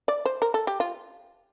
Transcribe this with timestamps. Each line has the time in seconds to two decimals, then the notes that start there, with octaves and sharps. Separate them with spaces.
0.08 D5
0.25 C5
0.42 A#4
0.54 A4
0.67 G4
0.80 F4